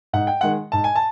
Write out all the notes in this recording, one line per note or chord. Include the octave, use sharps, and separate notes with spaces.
G#2 F#5
G5
D#3 G#3 F#5
G#2 A5
G#5
A5